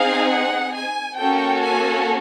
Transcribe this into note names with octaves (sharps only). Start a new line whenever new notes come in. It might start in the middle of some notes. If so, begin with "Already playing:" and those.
Already playing: C4 D#4 G#4 F5
F#5
G#5
A#3 C#4 F#4 A4 G5
G#5